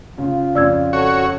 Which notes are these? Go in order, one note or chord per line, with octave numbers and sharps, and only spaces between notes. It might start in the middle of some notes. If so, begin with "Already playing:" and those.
C#3 F4
F2 C#3 D5 E6 G#6
F#4 A4 C#5